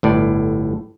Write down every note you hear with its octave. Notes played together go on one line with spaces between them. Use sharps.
G1 A2 D5